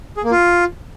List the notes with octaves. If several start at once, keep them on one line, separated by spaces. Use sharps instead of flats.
G#4
A#3
F4